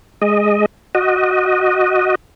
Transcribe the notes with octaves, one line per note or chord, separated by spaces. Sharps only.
G#3 D#5
F#4 D#5